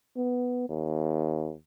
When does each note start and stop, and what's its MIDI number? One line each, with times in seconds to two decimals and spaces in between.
0.17 0.68 59
0.69 1.55 39